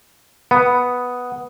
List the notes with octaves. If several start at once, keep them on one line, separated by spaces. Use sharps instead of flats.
B3 F#5 D#6